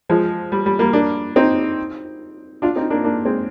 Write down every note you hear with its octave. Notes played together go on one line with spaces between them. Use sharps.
F3 G#3
G3
G3
G3 A#3
A#3 D4
C4 D#4
D4 F4
C4 D#4
A#3 D4
A#3 D4
G#3 C4